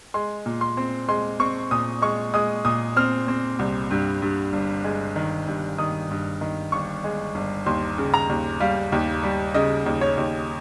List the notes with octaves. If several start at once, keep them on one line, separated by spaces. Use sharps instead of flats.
G#3 C6
A#2
C6
C4
G#3 C6
C4 C#6
A#2 D#6
G#3 C#6
G#3 D#6
A#2 D#6
C4 F6
C4
C2
G2
G2
G1
G#3
D#3
G2
D#3 D#6
G2
D#3
G1 C#6
G#3
G1
D#2 C6
C#3
A#5
D#2
G3 F5
D#2
G3
C#3 D#5
D#2
C#5
D#2